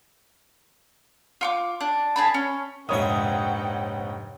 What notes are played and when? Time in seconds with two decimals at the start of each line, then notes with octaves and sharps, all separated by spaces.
1.41 F4 C#6 D6
1.81 D4
2.16 G#4 A5 B5
2.34 C#4
2.89 F1 A#1 G#2 C#5 E5 F#5 G5 D#6